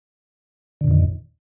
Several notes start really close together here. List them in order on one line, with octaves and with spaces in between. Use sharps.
D3 A#2 F2 D#3